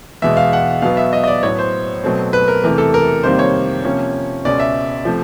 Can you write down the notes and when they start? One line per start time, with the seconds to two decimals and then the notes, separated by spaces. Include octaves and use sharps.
0.22 E2 B2 G#3 E5
0.37 F5
0.53 F#5
0.82 B2 F#3 B3 F5
0.97 E5
1.13 D#5
1.24 D#5
1.28 D5
1.43 A2 F#3 B3 C#5
1.59 C5
2.04 B2 F#3 A3 C4
2.33 B4
2.48 A#4
2.63 E2 C3 E3 A3 A#4
2.78 A4
2.94 A#4
3.23 F2 C3 D#3 G3 A#3 C5
3.39 C#5
3.84 C3 F3 A#3 C#4
4.45 C#2 B2 G#3 C#4 D5
4.60 E5
5.05 C3 F3 A3